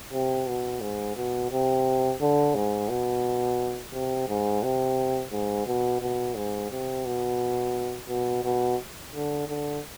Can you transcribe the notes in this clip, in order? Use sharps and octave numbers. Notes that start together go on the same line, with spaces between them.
C3
B2
G#2
B2
C3
D3
G#2
B2
C3
G#2
C3
G#2
B2
B2
G#2
C3
B2
B2
B2
D3
D3